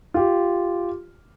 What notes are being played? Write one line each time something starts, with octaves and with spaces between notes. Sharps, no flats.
F4 G4